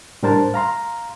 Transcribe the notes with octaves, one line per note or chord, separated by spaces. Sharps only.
A2 G3 D4 A#4 C5 A5
F5 A#5 C6